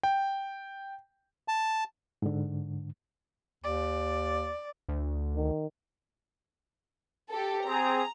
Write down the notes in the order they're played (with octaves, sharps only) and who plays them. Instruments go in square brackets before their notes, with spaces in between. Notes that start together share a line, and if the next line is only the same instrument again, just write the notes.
[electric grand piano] G5
[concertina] A5
[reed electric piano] G#2 D3
[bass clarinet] D#2 [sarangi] D5
[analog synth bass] D2
[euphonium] D#3
[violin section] G4 A4
[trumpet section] C4 G#4 [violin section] A#5